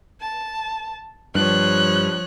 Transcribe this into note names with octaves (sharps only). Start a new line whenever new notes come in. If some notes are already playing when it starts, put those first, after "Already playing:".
A5
G2 F3 C#5 F#6